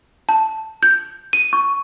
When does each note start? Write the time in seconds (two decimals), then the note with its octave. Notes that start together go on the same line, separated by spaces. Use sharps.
0.29 A5
0.83 G6
1.33 D#7
1.53 C#6